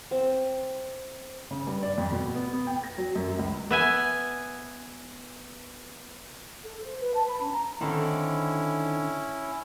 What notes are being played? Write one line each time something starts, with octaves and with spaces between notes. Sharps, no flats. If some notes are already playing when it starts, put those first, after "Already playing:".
C4
C#3
G2
D5
F2
B2
B3
B3
G5
A#6
F#3
F#2
C#2
B3 E5 G#5
A4
C5
B4
A5
B5
C#4
A#5
D3 D#3 C4 C#4 E4